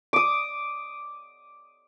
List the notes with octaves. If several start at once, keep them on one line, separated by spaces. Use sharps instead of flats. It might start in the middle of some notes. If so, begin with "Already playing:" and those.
D6 D#6